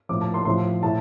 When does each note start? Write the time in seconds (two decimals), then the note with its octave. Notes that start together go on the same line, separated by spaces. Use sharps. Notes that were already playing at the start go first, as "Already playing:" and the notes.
0.09 A2 F3 D6
0.21 A5
0.34 C6
0.45 A2 F3 C6
0.83 A2 A5